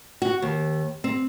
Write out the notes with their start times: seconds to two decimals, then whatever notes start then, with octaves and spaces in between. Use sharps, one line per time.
0.22 F#4
0.42 D#2
1.04 C4